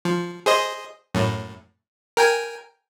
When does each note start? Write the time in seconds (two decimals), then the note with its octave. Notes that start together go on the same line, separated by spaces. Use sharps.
0.05 F3
0.46 G#4 C5 D#5
1.14 F#2 A2
2.17 A#4 G5 G#5